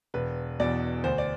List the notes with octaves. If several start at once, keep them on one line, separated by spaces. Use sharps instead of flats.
E1 B4
E2 B2 D5
D2 C5
D5